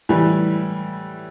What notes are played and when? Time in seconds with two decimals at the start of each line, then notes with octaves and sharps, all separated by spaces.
0.09 A2 E3 G3